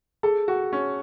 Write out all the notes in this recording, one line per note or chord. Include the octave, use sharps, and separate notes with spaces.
G#4 A4
F#4
C#4